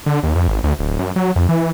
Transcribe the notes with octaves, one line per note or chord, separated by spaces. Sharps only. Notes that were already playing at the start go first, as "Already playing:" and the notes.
D3
D#2
F2
G#1
D2
D1
F#2
F#3
F2
E3